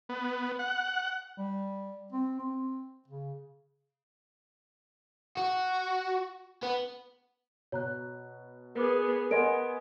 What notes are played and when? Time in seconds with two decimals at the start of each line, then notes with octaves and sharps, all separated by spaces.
0.09 B3
0.59 F#5
1.38 G3
2.12 C4
2.40 C4
3.08 C#3
5.37 F#4
6.63 B3
7.72 B2 C#5 A#5 F#6
8.75 B3 G#4 A#4 B4 D6
9.31 B3 A#4 D#5 F#5 G#5 C6 D7